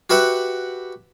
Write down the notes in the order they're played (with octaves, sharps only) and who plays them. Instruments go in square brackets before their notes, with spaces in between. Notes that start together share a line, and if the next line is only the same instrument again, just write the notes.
[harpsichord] F#4 G4 B4 E5 F#5